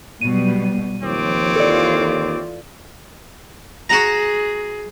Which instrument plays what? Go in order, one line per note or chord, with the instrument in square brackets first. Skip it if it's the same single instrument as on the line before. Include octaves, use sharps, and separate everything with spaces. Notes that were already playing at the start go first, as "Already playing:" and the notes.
[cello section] B2 F#3 G3 [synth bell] D#7
[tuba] D#2 [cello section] F3 [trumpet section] C4 C#5 D6
[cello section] E3 F4 [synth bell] A4 D5
[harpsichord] F#4 F#5 A#5 [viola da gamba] G#4